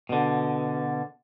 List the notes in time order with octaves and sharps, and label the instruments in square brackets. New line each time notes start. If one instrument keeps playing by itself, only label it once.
[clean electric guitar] B2 D3